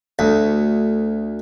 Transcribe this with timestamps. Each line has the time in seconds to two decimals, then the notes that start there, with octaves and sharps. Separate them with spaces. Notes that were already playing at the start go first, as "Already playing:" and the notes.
0.19 D2